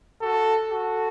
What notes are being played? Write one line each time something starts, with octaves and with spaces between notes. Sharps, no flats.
F#4 A4
F#4 A4